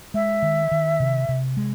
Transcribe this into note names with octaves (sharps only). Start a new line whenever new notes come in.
G#3 E5
D#3
D#3
C3
C3
G#3